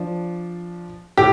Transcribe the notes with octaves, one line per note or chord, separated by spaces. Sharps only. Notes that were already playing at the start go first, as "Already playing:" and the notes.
Already playing: F3 D4
A2 G4